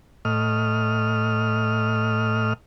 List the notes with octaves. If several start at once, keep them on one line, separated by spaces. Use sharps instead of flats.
A2 D#5 F6